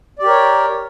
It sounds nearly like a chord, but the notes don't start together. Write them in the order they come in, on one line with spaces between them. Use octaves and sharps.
D5 G4 A#4 C#5